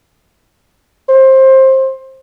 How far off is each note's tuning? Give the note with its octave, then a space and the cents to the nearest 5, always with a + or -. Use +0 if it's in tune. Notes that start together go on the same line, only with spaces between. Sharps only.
C5 +20